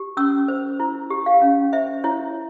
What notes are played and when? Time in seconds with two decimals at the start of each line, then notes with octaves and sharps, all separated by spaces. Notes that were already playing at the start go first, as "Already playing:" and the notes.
Already playing: G4
0.17 C#4 E6
0.48 C5
0.80 E4
1.10 G4
1.26 F5
1.42 C#4
1.73 C5 E5
2.04 E4 C#5